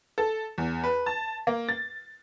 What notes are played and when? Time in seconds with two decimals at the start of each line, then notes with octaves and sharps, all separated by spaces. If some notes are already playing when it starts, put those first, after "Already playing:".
0.18 A4
0.58 E2
0.84 B4
1.06 A5
1.47 A#3
1.69 A6